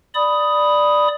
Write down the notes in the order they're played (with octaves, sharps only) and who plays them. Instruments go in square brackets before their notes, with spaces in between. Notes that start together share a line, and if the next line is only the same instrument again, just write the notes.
[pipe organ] D5 B5 D#6